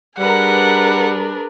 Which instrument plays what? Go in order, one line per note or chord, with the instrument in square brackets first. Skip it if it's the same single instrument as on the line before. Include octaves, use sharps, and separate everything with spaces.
[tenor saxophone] G3 [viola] D4 G#4 [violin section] A#4 B4 [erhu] F#5